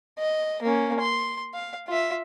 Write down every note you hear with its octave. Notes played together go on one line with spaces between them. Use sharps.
D#5
A#3 C#4
C6
F5
F4 E5